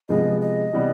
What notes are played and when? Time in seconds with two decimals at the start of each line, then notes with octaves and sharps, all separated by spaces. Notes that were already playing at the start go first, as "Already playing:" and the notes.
0.09 C3 F3 G#3 B3 D#5
0.41 D#5
0.73 C3 E3 G3 B3